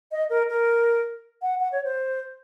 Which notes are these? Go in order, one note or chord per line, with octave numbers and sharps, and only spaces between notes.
D#5
A#4
A#4
F#5
F#5
C#5
C5